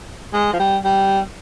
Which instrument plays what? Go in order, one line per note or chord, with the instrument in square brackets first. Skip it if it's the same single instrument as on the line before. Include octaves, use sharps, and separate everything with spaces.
[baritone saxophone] G#3
F3
G3
G3